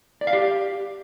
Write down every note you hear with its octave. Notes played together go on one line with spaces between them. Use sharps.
D5
F5
G4